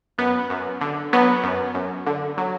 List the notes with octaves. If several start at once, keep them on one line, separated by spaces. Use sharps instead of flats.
F#2 B3
F#2
D3
F#3 B3
F#2
F#2
D3
F#3